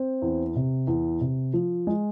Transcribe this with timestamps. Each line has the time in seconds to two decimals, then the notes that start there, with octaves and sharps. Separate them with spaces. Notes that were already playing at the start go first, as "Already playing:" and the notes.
Already playing: C4
0.22 E2
0.56 C3
0.87 E2
1.21 C3
1.54 F3
1.87 G#3